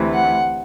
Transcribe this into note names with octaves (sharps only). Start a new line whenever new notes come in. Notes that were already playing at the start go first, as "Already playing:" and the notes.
Already playing: D2 C3 E3
F#5